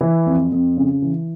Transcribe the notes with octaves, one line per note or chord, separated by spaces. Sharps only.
E3
F2
F2
C#3
E3